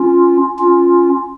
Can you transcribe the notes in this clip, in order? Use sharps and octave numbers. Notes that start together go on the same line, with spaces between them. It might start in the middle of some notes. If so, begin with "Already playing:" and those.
Already playing: C#4 F4
C#4 F4